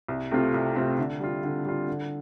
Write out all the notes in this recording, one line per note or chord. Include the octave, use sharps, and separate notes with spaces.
C2
C3 A3 C4 F4
C2
C3 A3 C4 F4
D3
G3 F4
D3
G3 F4
D3